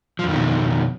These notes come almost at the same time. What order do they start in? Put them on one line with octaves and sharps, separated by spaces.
F3 F2 D#3 B2